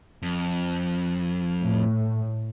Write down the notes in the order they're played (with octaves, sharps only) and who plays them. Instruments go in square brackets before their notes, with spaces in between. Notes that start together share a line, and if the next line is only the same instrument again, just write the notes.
[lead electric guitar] F2
[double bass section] A2